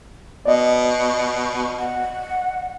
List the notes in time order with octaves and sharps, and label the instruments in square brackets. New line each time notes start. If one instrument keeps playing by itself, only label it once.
[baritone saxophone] B2 [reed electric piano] D5 D#5
[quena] F#5